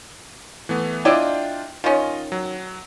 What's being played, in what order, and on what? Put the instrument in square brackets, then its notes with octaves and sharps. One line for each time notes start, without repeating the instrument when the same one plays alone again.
[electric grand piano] E3 A3 B3
[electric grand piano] D4 F4 G5 [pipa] E4 D5 D#5
[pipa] D#3 C#4 [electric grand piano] F4 D#5
[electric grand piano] F#3